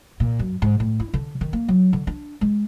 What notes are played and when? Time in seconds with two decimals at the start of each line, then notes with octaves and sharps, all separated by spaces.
0.20 A#2
0.39 F#2
0.62 G#2
0.80 A2
1.00 E4
1.14 D3
1.41 D#3
1.53 A#3
1.68 F#3
1.93 D3
2.07 D4
2.41 G#3